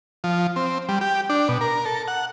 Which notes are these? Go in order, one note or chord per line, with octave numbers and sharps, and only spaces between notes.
F3
C4
G3
G4
D4
B2
A#4
A4
F#5